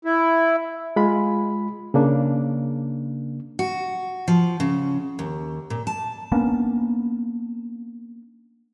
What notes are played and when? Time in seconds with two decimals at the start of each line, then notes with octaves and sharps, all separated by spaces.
0.05 E4
0.96 G#3 F4 B5
1.94 C#3 A#3 D4
3.59 F#4
4.28 F3
4.60 C#3
5.19 D#2
5.70 A#2
5.87 A5
6.32 A#3 B3 C#4 D4